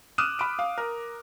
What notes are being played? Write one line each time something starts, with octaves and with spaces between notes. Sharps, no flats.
D6 D#6 F6 F#6 D#7 E7
B5 D7
F5
A#4